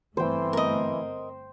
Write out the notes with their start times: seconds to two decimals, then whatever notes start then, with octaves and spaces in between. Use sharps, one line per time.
0.17 G1 E3 A3 C4 C5 G5
0.53 A#4 D#5